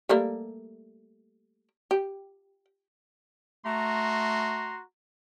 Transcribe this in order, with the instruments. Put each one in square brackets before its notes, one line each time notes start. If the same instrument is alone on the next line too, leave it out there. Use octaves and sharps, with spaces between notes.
[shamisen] G3 A3 A#3
G4
[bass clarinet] A3 [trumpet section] F#4 A#5 C6